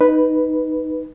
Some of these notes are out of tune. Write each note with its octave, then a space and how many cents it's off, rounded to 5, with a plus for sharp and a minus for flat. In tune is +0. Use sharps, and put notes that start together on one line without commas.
D#4 +0 B4 +0